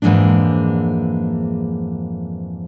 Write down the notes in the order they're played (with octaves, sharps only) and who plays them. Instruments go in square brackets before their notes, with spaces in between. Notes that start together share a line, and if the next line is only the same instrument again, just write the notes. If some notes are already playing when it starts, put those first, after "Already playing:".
[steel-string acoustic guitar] F2 G#2 E3 G#3 A#3 D4